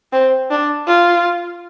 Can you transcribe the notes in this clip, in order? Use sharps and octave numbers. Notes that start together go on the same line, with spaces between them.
C4
D4
F4